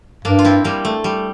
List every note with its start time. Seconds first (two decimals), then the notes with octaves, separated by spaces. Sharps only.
0.25 G2 A#3 D4
0.39 F4
0.45 C4 E4
0.64 G3 A#3
0.85 A3
1.04 G3